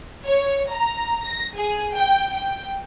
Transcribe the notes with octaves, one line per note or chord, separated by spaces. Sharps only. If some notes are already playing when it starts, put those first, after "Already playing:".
C#5
A#5
A#6
G#4
G5
G5